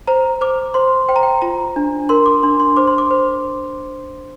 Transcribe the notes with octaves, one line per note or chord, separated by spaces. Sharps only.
C5 A#5
C5 D6
C5 C6
C5 G5
A#5
G5
F4 A#5
D4
A#4 C6
D6
D4 C6
C6
C5 D6
C6
D6
C5